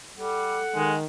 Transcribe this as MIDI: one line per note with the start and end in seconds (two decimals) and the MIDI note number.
0.18 0.59 55
0.18 0.92 69
0.18 0.99 78
0.76 1.06 51
0.76 0.95 56